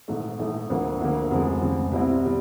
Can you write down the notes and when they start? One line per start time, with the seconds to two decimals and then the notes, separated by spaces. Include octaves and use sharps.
0.08 A#1 G#2 E3 A3
0.39 A#1 G#2 E3 A3
0.70 D2 D3 F3 A#3
1.00 D2 D3 F3 A#3
1.31 F1 F2 C#3 F3 G#3
1.61 F1 F2 C#3 F3 G#3
1.92 C2 B2 G3 C4 E4
2.23 B2 G3